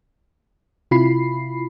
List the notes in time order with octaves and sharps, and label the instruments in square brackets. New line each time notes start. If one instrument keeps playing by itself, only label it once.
[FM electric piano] C3 E4 F4 B5 C7